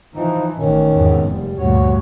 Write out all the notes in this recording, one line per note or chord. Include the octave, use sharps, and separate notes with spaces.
E3 F3 D#4
A1 D#3 C#4
E2 G#2 C3
F1 G3
D2 G2 A#2 F#4 C#5